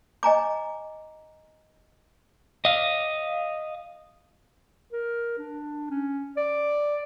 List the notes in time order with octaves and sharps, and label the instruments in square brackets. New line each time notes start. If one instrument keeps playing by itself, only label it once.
[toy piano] D#5 G#5 A#5 D6
[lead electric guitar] D#5 F5
[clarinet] A#4
D4
C#4
D5